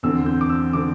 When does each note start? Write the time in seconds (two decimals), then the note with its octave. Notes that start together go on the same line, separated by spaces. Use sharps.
0.03 E2 D3 C4 E6
0.26 G6
0.41 D6
0.50 E6
0.73 D3 C4 D6